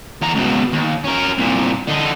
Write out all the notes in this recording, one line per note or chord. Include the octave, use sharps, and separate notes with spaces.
E2 A#5
C#2 B2
D#2
C#4 A#4
C2 A#2
D3 D#4